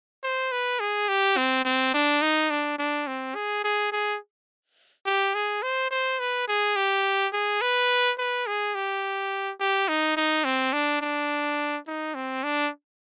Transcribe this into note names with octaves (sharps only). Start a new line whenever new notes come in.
C5
B4
G#4
G4
C4
C4
D4
D#4
D4
D4
C4
G#4
G#4
G#4
G4
G#4
C5
C5
B4
G#4
G4
G#4
B4
B4
G#4
G4
G4
D#4
D#4
C4
D4
D4
D#4
C4
D4